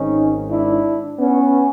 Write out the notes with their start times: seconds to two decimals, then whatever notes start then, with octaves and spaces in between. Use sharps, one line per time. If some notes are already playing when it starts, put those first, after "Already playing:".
Already playing: G#1 G#2 D#3 C#4 D#4
0.50 D4 E4
1.19 B3 C#4